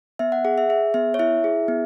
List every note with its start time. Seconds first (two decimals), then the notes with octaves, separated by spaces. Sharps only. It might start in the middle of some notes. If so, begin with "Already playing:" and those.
0.19 B3 E5
0.32 F#5
0.45 G#4 F#5
0.58 E5
0.69 G#4 E5
0.94 B3 E5
1.14 C#5
1.19 E4 E5
1.44 G#4
1.68 B3